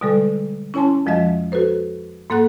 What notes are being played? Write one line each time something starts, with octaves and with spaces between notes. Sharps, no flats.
B2 D3 G3 G#3 A4
C#4 E4 C#5 G#5 A5 C6
F2 F3 G#3 D#5 E5
F#4 A4 B4 C5
G#2 A#3 A4 F#5 F#6